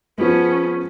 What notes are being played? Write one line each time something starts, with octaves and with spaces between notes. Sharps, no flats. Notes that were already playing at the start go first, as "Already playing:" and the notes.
F3 G#3 B3 C#4